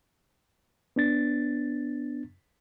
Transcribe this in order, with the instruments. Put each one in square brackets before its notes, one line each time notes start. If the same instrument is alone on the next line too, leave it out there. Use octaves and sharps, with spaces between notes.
[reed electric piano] B3 D4 A6